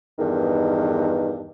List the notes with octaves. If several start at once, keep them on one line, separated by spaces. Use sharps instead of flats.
E2 G2 D#3